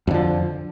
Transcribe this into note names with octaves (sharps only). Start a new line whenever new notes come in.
F2 D3 F3